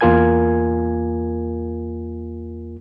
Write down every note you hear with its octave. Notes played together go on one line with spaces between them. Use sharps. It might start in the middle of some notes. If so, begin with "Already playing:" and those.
E2 A#3 F4 A#4 G#5 G#6